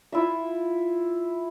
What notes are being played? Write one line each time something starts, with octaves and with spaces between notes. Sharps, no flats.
E4 F4 E5